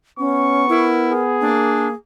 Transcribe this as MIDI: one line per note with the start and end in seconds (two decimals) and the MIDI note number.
0.19 1.54 59
0.19 0.69 61
0.19 0.87 85
0.69 1.13 64
0.69 1.24 70
1.12 1.97 68
1.41 1.94 58
1.41 1.88 62